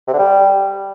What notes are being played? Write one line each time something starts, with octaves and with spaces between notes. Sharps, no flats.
C3
D3
G3